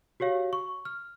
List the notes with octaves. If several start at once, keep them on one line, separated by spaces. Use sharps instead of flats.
F#4 G4 C#5 F5
C#6
F6